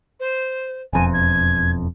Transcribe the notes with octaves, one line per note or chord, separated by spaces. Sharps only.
C5
E1 F2 G#5
G#6